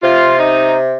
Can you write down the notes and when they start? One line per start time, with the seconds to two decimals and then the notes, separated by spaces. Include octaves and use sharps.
0.02 C3 F4
0.38 D#4